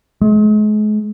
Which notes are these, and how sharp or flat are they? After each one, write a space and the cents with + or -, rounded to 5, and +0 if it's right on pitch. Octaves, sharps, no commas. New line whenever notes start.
G#3 +40